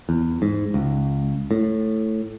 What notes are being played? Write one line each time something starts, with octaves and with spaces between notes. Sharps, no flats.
E2
G#2
C#2
A2